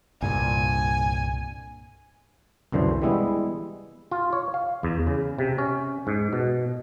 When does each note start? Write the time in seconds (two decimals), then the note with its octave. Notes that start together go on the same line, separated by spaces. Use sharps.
0.22 C2 G2 A#2 G#5
2.72 C2 F#2 D3 E3 C5
3.02 E3 G3 G#3 B3 E4
4.11 F4
4.33 C#5
4.54 F5
4.83 E2
5.07 C#3
5.38 C3
5.58 C#4
6.07 G#2
6.33 B2